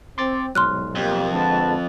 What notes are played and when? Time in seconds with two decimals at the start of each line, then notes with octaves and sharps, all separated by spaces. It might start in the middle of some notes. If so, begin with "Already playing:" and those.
0.18 C4 C6 D6 A6
0.55 C2 G#2 B2 F#3 C6 F6 F#6
0.96 F2 A#3 G4
1.33 D3 F3 G#3 B4 F#5 A5